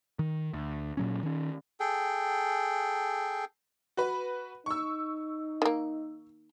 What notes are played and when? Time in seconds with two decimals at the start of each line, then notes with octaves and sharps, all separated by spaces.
0.19 D#3
0.53 D2
0.97 A#2 F#3 C#4
1.23 D#3 C#4
1.80 G#4 A4 G5
3.97 F#4 B4
4.66 D#4 C#6 E6
5.62 D#3 A#3